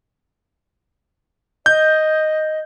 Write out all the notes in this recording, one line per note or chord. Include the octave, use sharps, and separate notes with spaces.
D#5 G6